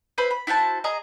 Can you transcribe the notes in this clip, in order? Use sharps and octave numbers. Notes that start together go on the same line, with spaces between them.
B4 C5 E5 B5
B5
E4 F#4 C5 A5
G#4 D#5 A#5